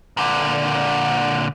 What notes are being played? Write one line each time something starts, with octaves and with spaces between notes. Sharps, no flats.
A#2 D3